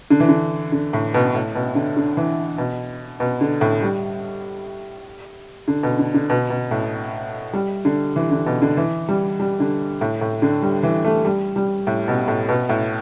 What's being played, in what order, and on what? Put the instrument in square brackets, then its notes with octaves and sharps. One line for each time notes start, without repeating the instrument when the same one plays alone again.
[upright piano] D3
E3
D3
D3
A2
B2
A2
B2
D3
D3
E3
B2
B2
D3
A2
G3
D3
B2
D3
D3
B2
B2
A2
G3
D3
E3
D3
B2
D3
E3
G3
G3
D3
A2
A2
D3
G3
E3
A3
G3
G3
A2
B2
A2
B2
A2